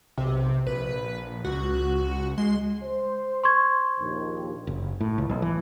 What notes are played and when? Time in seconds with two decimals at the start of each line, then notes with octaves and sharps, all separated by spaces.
0.17 B1 C3
0.67 A#1 B4
1.44 C#2 F#4
2.38 G#3 C6
2.84 C5
3.44 C6 C#6 G#6
3.99 A#1 D#2
4.67 F#1
5.00 A2
5.18 C#2
5.29 B1
5.42 E3